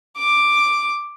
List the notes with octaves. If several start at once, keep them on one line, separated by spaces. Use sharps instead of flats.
D6